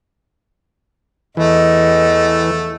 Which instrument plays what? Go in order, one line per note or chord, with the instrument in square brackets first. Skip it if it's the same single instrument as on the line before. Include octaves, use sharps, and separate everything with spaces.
[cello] E2 [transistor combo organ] E3 [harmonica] A3 [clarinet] D#5